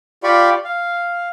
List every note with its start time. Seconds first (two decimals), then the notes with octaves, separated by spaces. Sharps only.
0.23 F4 G4 D5 B5 C#6
0.65 F5